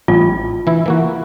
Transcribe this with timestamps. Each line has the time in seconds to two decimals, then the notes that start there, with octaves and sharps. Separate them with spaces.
0.08 A1 F4
0.67 E3 E4
0.86 E3 A#3 F#4